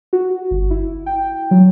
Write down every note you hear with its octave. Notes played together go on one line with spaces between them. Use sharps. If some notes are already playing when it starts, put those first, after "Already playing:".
F#4
G1
E4
G5
F#3